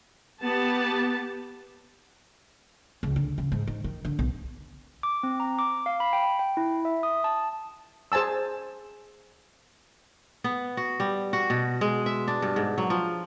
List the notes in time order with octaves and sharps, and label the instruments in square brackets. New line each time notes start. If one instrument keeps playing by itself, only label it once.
[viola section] B3 G4 A5
[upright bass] C#2
D3
C#3
G#2
D#3
D#3
D3
B1
[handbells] D6
C4
A#5
D6
F5
B5
G5
G5
E4
E5
D#6
A5
[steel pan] G#4 C5 G#5 A5 E6
[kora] B3
F#4
G3
F#4
B2
G#3
E5
D4
G2
G#2
F#3
F3